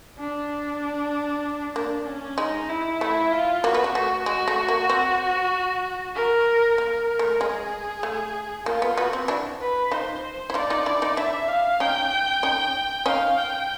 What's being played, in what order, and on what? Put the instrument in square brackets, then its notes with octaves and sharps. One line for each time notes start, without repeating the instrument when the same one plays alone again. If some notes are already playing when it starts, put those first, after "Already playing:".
[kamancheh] D4
[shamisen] A#3 [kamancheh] D4
[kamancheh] C#4
[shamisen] G#3 [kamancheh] D#4
[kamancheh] E4
[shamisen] A3 [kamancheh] E4
[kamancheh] F4
[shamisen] A#3 [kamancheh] F#4
[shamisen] B3
A#3
[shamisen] A3 [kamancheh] F#4
[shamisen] G#3 [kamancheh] F#4
[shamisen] A3
A#3
C4
[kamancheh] A#4
[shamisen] A#3 [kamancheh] A#4
[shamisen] A3
[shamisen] G#3 [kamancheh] G#4
[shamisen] A3
[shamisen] A#3 [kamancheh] F4
[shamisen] B3
[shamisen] B3 [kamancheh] F#4
[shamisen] C4
D4 E4
[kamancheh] B4
[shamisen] D#4 F4 [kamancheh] C5
[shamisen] E4
[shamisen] D#4 F4 [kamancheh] D5
[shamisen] D#4 F4
D4 E4
D#4 F4
[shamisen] D4 E4 [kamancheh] E5
[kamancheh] F5
[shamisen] C#4 D#4 [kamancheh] G5
[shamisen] C#4 D#4
[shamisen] C#4 D#4 [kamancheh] F5
[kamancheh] G5